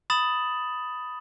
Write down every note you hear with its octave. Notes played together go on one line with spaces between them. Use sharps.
B5 D#6 A6 E7 F#7